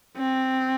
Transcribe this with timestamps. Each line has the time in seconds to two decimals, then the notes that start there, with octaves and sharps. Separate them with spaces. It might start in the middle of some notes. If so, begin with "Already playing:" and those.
0.17 C4